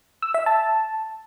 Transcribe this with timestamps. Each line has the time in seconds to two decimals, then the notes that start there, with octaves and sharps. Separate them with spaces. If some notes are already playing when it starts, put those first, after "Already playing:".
0.22 E6
0.34 E5
0.46 A5